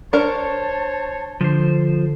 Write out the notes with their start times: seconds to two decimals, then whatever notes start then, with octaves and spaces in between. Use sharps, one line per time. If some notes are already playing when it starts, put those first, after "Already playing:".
0.13 D4 A#4 C5 C#5 A5 C#6
1.41 D3 F3 C5